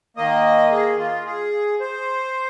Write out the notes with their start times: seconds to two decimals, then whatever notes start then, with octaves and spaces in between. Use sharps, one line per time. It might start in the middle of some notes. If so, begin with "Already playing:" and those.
0.17 D#3 A#3 D#5
0.72 G#4
0.99 F4
1.26 G#4
1.80 C5